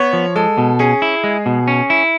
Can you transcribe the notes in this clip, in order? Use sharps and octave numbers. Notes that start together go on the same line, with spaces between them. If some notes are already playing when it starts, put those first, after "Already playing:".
Already playing: B3 C#5
F3
G#3 A4
B2
C#4 G#4
E4
G#3
B2
C#4
E4